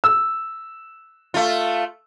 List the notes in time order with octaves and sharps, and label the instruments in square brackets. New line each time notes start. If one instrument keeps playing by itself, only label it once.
[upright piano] E6
[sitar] A3 F4